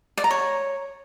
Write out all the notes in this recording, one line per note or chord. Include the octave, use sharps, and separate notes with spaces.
D5
A#5
C#5